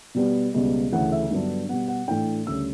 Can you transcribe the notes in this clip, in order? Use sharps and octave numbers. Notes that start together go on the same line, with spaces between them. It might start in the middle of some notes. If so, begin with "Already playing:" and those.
B2 G3 B3
C#2 B2 G3 B3
D2 C#3 E3 A3 C#4 F#5
E5
G2 D3 F#3 B3 D4
B2 G3 B3 F#5
F#5
A2 E3 A3 D4 G5
D2 C#3 G3 C#4 E6